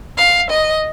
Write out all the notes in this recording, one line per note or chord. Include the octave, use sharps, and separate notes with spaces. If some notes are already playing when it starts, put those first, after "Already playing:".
F5
D#5